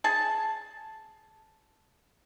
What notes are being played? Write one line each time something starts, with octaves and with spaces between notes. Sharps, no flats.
G#4 A5